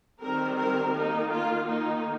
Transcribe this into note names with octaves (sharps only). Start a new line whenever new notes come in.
D#3 G3 C4 A#4
A#4
D#3 A#3 D#4
F4
D#3 A#3 D#4